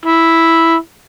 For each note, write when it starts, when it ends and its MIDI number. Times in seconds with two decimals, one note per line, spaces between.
0.05 0.75 64